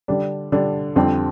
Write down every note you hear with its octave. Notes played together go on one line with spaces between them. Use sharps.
D3 G3 D4
D3 G3 D4
F2 D3 G3 C4 G4